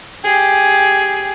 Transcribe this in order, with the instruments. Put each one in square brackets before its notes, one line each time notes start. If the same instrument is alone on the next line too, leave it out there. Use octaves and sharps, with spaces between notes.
[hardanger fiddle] G4 G#4